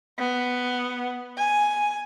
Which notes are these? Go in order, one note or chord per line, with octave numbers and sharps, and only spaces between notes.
B3
G#5